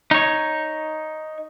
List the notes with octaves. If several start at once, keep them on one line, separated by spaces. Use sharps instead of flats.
D#4 C#5